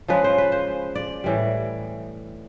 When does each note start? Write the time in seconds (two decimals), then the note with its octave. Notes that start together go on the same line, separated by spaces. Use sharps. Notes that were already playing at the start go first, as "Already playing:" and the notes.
0.08 C#3 F3 G#3 B4
0.24 C5
0.38 B4
0.52 C5
0.95 D5
1.24 A2 E3 G3